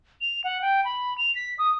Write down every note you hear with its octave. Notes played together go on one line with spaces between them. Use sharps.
F7
F#5
G5
B5
F7
B6
D#6